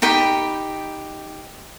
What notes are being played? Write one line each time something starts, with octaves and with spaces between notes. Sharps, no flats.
D#4 G4 G5 B5